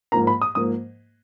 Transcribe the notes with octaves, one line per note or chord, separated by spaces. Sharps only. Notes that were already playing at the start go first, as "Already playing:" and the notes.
G#2 F3 A#3 A#5
B5
D#6
G#2 F3 A#3 D#6